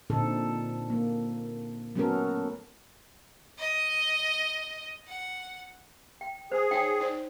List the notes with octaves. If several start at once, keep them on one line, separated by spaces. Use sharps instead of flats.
A#2 D3 C4 D#4 A4
A#3
F#3 A3 B3 C#4 A4 A#4
D#5
F#5
G5
G#4 C5
D#4 C#5 G5 G#5
D#4 C5 D5